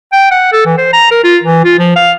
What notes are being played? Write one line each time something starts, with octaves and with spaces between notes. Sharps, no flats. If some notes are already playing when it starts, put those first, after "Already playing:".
G5
F#5
A4
E3
C5
A#5
A#4
F4
E3
F4
F3
F5